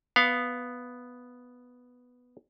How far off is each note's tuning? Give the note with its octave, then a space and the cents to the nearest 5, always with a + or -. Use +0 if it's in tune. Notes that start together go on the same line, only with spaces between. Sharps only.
B3 +0 F5 +0